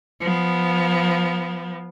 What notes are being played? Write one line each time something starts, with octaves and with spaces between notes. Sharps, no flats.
F3 B3